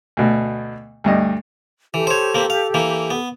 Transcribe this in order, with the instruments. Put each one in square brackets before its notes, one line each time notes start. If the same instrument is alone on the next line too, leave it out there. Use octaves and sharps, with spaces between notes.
[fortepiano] D2 B2
D2 G2 D#5
[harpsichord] E3 [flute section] G4 A4
[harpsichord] C5 C#5
A#3 C4
F5
E3 A#3
B3